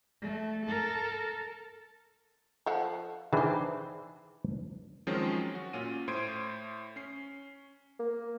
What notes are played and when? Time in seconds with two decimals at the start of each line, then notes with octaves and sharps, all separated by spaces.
0.21 A3
0.66 A4 A#4
2.66 F3 A4 F#5
3.33 D#3 E3 D4 G#4 C5
5.07 D#3 F3 F#3 G#3 C4 C#4
5.55 F#4
5.73 A#2 C#4 F4 D#7
6.08 A2 C5 C6 G#6 D7 D#7
6.96 C#4 C7
7.99 A#3